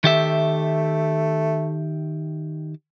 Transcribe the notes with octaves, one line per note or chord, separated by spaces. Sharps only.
D#3 A3 G4 E5